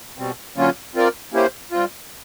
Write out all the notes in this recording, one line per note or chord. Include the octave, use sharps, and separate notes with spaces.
B2 G3 C4
D3 F#3 A#3 C#4 F4
C4 F4 A#4 D5
A#3 C#4 E4 G4 C5
G3 C4 F4